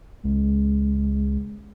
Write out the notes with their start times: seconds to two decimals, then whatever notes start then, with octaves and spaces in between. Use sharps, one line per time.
0.25 C#2 G#3